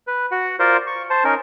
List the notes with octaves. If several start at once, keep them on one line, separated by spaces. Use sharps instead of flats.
B4
F#4 F#5
F4 A#4 C5 D5
C#6
C5 A5
C#4 D#4 A#4